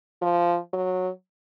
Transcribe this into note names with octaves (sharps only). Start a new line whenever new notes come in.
F3
F#3